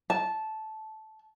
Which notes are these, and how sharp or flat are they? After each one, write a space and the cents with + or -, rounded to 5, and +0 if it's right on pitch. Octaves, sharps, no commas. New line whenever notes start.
A5 -10